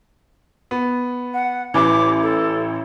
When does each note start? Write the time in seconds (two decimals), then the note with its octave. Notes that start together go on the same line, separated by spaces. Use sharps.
0.71 B3
1.33 F#5
1.74 A1 E3 D6
2.22 A4